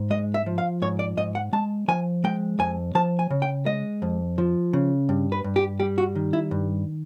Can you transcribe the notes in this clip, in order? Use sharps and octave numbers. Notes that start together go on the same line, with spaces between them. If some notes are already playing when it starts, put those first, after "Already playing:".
Already playing: G#2
G#3 D#5
E5
F3
F5
G#2 C#5
D5
G#2 D#5
F#5
G#3 A5
F3 G#5
G#3 G5
F2 G#5
F3 A5
G#5
C#3
G5
G#3 D#5
F2
F3
C#3
G2
B4
G2
G4
G3 G4
F#4
D#3
E4
G2